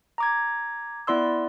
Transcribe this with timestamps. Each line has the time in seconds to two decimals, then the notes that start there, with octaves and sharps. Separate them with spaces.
0.18 A#5 D6 G#6
1.07 B3 E4 D5 C6 E6